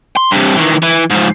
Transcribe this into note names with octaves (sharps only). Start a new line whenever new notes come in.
C6
G2 C3
D#3 E3
E3
G#2 F3